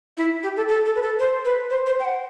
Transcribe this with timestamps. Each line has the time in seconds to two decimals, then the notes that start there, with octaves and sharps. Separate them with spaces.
0.17 E4
0.43 G4
0.57 A4
0.68 A4
0.86 A4
0.95 B4
1.02 A4
1.19 C5
1.45 B4
1.70 C5
1.86 C5
2.00 G5
2.04 F#5